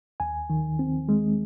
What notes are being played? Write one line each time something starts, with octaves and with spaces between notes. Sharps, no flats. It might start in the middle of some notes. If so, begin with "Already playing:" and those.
D#2 G#5
D#3
C4
G#3